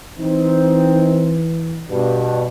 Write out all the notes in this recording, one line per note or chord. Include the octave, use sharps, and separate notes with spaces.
E3 C4 D#4
G2 B2